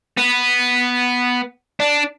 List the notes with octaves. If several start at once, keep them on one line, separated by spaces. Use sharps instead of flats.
B3
D4